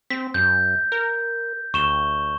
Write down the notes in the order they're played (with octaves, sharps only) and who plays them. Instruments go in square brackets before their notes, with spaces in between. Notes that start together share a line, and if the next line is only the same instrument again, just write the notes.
[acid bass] C4 [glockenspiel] B6
[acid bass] F#2 [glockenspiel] G6
[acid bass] A#4
[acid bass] D2 [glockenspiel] C#6 E7 G7